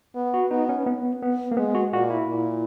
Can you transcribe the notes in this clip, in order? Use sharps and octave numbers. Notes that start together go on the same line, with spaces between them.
B3
F#4
B3 D#4
C#4
B3
B3
A#3
G#3 B3
F#4
A#2 F#4
E4
A#2